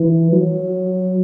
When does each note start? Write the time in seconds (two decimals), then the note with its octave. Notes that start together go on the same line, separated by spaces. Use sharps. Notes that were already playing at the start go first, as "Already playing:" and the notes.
Already playing: E3
0.32 F#3